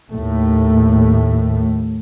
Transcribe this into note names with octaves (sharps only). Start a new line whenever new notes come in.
D#2 A2 A3